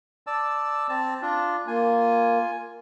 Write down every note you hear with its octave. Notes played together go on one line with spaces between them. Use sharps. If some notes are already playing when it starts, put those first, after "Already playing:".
D5 A5 E6
C4 A5
D4 F4
A#3 F4 G#5